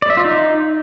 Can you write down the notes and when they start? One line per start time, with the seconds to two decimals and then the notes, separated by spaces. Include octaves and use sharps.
0.02 D5
0.10 E5
0.17 F4
0.25 D#4